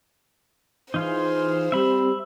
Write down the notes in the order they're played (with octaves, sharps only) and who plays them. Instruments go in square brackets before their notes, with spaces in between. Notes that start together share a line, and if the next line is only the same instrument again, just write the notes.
[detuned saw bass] E3 [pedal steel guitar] D#4 F4 G#4 [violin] C5
[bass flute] G3 [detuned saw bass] C4 [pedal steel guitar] E5 B5